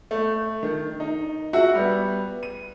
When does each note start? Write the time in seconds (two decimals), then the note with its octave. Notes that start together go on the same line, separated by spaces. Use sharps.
0.11 A3
0.63 D#3
1.00 D#4
1.53 F#4 E5 F#5
1.75 G3 B3
2.43 D#7